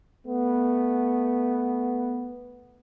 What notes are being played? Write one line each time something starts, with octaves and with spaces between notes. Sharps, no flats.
A3 B3